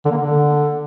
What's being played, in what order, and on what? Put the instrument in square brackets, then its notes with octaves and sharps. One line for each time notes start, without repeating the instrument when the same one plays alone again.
[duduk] D3
A#3
D3